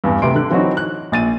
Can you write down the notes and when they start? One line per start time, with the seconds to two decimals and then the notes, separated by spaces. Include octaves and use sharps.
0.04 E2 G2
0.22 D2 C3 B4 C6 D7
0.35 D3 F#6
0.51 E3 F#3 C4 D#4 F#4
0.77 F#6
1.12 A#1 A6 D#7